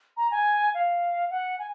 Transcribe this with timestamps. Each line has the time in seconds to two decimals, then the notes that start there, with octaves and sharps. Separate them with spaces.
0.17 A#5
0.31 G#5
0.74 F5
1.30 F#5
1.59 G#5